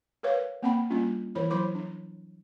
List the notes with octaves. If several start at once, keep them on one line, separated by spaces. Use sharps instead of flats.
A#4 B4 C#5 F5
A#3 C4 F#5 G5 A5 B5
G3 A#3 C#4 D4 F4
E3 E4 A#4 C5 C#5 B5
F#3 E4 C5 B5 C6 D6
D4